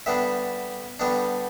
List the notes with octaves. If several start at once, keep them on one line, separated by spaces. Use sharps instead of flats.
D3 G3 B3 D4 E5
D3 G3 B3 D4